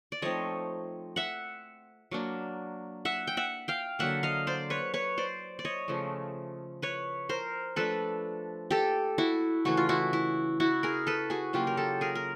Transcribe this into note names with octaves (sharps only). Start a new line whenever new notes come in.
D5
F3 A3 C4 D#4 C#5 D#5
E5 F#5
F#3 A#3 D4
E5 F#5
G5
E5 F#5
F5 G5
D3 F#3 A#3 E5 F#5
D#5 F5
C5 D5
B4 C#5
B4 C#5
C5 D5
D5
C#5 D#5
C#3 F3 A3
B4 C#5
A#4 C5
F3 A3 D4 A4 B4
G4 A4
E4 F#4
C#3 E3 A3 F#4
F4
E4 F#4
E4
E4 F#4
G#4 A#4
A4 B4
F#4 G#4
C#3 F#3 A#3 F4 G4
A#4
G4 A4
G#4 A#4
A#4